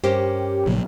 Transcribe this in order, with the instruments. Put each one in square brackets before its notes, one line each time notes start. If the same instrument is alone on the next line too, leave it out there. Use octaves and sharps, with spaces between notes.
[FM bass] G2 [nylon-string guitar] C#4 A#4 C5 [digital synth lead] G4
[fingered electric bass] A#1 A#2 F#3 [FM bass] C#3